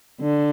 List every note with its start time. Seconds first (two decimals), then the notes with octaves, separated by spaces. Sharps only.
0.20 D3